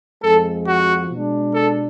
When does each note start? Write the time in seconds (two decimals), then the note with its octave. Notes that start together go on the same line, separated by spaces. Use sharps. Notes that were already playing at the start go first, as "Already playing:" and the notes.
0.23 F2 F3 G#3 A4
0.67 F#4
1.11 B2 G#3 D4
1.55 A4